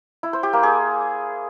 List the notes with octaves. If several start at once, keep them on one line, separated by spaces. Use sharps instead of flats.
E4
C5
G4
A#3
G#4